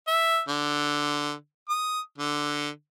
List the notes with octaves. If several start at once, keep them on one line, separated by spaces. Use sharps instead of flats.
E5
D3
D#6
D3